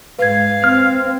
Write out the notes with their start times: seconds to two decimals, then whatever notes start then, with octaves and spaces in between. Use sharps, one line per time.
0.19 G#2 B4 F5 G#6
0.64 C4 F6